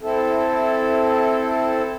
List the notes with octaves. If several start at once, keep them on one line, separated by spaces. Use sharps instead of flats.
C4 E4 A4